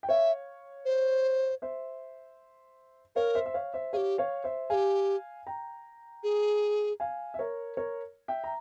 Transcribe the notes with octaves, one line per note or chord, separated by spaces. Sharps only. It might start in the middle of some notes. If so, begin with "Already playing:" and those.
G5
C#5 E5 F5
C5
C5 E5
A#4 C#5 F5
C5 E5
E5
C#5 F5
C5 E5
G4 G#4 C#5 F5
C#5 F5
C5 E5
G4 G#4 F5 G#5
G5 A#5
G#4
F5 G#5
E5
A#4 C#5
A#4 C#5
E5 G5
A#5